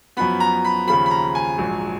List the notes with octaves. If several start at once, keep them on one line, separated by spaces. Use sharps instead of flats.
F#2 F3 B3 B5
A#5
B5
D#2 C#3 F3 B5
B5
A#5
G#5
A#1 G#2 F#3